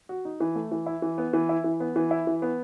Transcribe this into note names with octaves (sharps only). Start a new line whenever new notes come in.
F#4
D#4
E3
A3
E3
E4
E3
B3
E3
E4
E3
B3
E3
E4
E3
B3